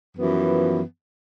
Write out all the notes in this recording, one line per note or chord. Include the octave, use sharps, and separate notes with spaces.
F#2 E3 F3 B3